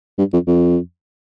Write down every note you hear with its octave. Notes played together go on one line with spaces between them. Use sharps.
G2
F2
F2